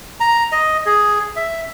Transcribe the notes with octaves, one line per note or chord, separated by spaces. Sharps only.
A#5
D#5
G#4
E5